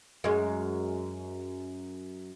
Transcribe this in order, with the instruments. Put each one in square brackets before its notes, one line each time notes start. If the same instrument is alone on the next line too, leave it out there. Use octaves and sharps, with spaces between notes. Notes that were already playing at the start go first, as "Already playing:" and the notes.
[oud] F#2 G#3